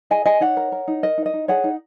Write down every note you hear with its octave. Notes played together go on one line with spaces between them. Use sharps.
G#4 D#5 G#5
G#4 D#5 G#5
D#4 C#5 F#5
A#4
A#4
D#4
A#4 D#5
D#4
D#5
D#4
G#4 C#5 F#5
D#4